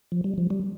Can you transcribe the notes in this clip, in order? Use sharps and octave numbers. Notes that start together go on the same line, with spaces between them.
F3
G3
F3
G3